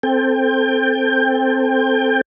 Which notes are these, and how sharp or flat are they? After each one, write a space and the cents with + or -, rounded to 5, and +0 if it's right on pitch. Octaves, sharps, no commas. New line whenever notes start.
C4 +0 A4 +0 G5 +25